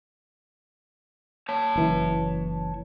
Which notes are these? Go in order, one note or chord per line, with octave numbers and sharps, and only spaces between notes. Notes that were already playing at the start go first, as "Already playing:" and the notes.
C#5 A5
F#1 E3